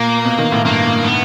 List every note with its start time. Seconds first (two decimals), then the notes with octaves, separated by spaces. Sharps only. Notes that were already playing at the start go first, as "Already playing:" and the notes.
Already playing: A#2 A#3
0.25 B2
0.39 D#3
0.52 A2
0.65 G2 A#3
1.04 B3